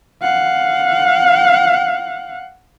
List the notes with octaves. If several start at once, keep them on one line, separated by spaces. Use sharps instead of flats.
F5 F#5